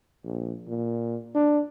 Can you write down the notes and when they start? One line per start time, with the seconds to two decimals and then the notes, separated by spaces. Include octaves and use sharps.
0.24 A#1
0.68 A#2
1.35 D4